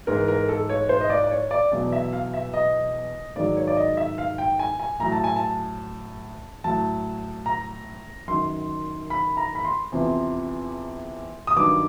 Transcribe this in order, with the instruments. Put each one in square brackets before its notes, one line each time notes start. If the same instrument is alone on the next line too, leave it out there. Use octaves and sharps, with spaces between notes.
[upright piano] G#2 E3 A#4
A#4
A4
C#5
C5
D#5
D5
D5
C#5
D5
E2 B2 F#3 D5
E5
F5
E5
D#5
G#2 D#3 F#3 D5
C#5
D5
D#5
E5
F5
G5
G#5
G#5
A2 F#3 A#5
A5
G#5
A5
A2 F#3 A5
A#5
F#2 D#3 F#3 C6
B5
A#5
B5
C6
E2 C3 F3
D#6
G2 D#3 F#3 D6